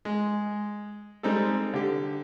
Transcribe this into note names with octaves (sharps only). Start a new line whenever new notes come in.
G#3
G3 G#3 C4 D#4 A4
D3 G4